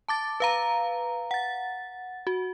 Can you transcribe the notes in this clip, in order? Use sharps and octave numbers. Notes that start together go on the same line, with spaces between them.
A5 D6 A6
B4 F5 A#5
F#5 A6
F#4